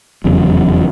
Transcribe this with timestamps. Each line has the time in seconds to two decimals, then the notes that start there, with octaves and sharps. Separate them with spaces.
0.24 F1 E2 C#3 F#3